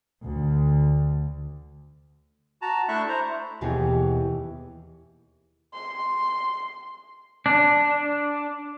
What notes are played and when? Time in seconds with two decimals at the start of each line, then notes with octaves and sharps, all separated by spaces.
0.24 D2
2.62 F#4 A5 A#5
2.88 A3 D4 E4 E5 C#6 F#6
3.08 C5 A#5
3.61 D#2 B2 E3 G4 G#4 F#5
5.74 C6
7.46 D4